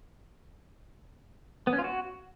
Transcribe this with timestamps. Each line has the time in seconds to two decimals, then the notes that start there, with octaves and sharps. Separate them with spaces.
1.67 B3
1.73 C#4
1.78 F4
1.84 F#4